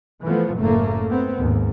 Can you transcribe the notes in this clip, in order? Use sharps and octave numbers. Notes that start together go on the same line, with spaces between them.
E3 F3 A3 B3
F#1 A2 A3 A#3
B3 C4
D#2 G#2